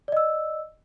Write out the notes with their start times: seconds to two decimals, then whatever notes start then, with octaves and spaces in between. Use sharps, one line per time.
0.08 D5
0.12 D#5
0.17 E6